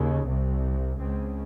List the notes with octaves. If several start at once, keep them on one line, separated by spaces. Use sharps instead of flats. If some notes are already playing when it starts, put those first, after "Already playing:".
Already playing: D#2 C#3
C2 C3
C#2 C#3 C4